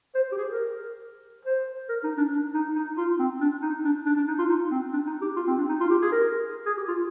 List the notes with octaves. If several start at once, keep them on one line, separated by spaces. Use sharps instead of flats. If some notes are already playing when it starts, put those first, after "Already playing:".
C5
G4
G#4
A#4
C5
A#4
D#4
D4
D4
D#4
D#4
F4
C4
D4
D#4
D4
D4
D4
D#4
F4
D#4
C4
D4
D#4
G4
F4
C4
D4
D#4
F4
G4
G#4
A#4
G#4
G4
F4